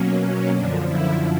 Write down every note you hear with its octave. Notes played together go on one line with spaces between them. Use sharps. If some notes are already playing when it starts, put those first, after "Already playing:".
Already playing: B2 F#3 A#3 C#4
F#2 D3 F3 D4
E4